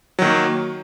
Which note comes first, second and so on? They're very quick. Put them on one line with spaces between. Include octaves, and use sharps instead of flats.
F#3 D#3 A#3